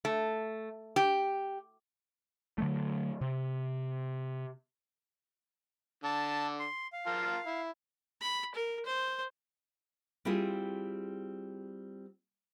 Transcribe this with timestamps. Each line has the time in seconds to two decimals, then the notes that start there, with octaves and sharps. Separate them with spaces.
0.05 A3
0.96 G4
2.58 D3 F#3 A3
3.21 C3
6.04 D3 A5
6.59 C6
6.93 F5
7.06 F4 A#4 A5
7.47 E4
8.21 B5
8.55 A#4
8.86 C5
10.25 G3 C4 E4 F4 G#4